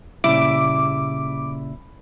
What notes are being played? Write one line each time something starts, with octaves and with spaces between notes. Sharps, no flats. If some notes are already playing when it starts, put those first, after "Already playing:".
A#2 C#3 G3 E4 D6